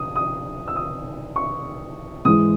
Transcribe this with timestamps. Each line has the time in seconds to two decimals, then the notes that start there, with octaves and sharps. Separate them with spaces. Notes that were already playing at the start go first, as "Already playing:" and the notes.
Already playing: D#6
0.16 D#6
0.68 E6
0.76 D#6
1.36 C#6
2.25 G#2 E3 G#3 D#6